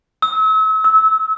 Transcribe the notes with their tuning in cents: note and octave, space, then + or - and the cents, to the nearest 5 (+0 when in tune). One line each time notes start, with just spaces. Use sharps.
E6 -40
E6 -25